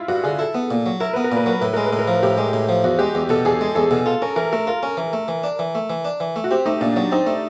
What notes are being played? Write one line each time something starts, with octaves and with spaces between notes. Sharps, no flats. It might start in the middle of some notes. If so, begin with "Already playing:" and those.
Already playing: E4 F4
G2 F#4
D3 G#4
E4 A4
B3
A#2
F#3
E4 A#4
B3 B4
A#4
A#2 B4
F#3 A#4
A2 B4
G#3 A#4
B4
A2
A#4
F3
A2 G4
G#3
A2
F3
E2 F#4
G#3 G4
E2
B2 A4
E2 G#4
G#3
E2 A4
B2 A4
F4 A4
C#4 A#4
E3 A#4
A3 A#4
F4 A#4
C#4
E3
A3
E3
D4
E3
A3
E3
D4
E3
A3
F#4
C4 G4
A3 D#4
A#2 D4
F#3 D4
C4 D#4
A3